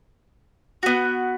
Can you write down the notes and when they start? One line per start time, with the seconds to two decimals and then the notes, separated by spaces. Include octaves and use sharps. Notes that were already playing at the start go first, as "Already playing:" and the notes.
0.83 B3 F#4